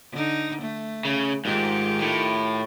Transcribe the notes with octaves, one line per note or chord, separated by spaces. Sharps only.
D3 D#4
A3
C#3
G#2 D#3 F4 G4
A2